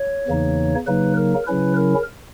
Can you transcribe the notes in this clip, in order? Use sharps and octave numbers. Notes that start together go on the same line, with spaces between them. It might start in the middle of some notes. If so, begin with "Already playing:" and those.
Already playing: C#5
E2 C#3 E3 A#3 D#4
C#3 F#3 A#3 D#4 B4
A#4
C#3 F#3 C#4 E4 B4
A#4